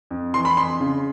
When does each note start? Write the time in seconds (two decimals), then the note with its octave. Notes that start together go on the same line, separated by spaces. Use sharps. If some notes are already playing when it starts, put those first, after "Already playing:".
0.11 F2
0.34 E3 C6
0.45 B5
0.56 F2 C6
0.80 C#3